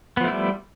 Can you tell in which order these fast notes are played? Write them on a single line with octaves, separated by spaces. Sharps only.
B3 F3 A3 E4 G3